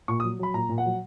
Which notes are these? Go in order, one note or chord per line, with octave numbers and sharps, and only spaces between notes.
A#2 C#6
D#6
F#3
F#3 B5
A#2 A#5
A#2
F#5
F#3